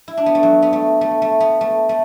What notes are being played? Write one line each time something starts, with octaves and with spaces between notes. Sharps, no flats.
E4
D4
B3
A3
F#3
B3
A3
A3
A3
B3
A3
A3